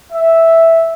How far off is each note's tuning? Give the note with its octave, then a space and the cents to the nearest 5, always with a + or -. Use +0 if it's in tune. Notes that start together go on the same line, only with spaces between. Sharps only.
E5 -5